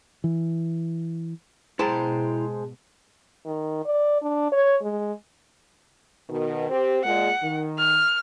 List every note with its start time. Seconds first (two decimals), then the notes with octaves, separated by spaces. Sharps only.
0.24 E3
1.79 G#2 B2 G#3 E4 C5 G5 A5 A#5
3.46 D#3
3.86 D5
4.22 D4
4.52 C#5
4.82 G#3
6.30 B2 D#3
6.69 C4 G4
7.04 A#2 G#3 F#5
7.42 D#3
7.78 F6